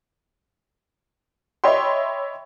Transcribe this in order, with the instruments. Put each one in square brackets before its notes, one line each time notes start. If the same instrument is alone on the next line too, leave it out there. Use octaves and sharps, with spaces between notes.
[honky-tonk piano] C#5 D#5 E5 G5 B5 C6